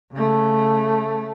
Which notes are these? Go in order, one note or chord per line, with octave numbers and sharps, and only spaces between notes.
C#3 A3